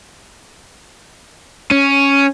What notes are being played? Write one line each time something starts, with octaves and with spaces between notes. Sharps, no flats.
C#4